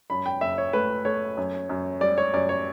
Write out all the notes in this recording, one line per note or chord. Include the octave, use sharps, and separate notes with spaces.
F#2 B5
G5
F#1 E5
C#5
A3 B4
A3 C#5
F#2
F#2
G3 D5
C#5
F#2 D5
C#5